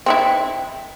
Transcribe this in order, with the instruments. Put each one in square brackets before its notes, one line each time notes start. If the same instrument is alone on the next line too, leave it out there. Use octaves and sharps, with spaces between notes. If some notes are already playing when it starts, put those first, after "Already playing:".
[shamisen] C4 D#4 E4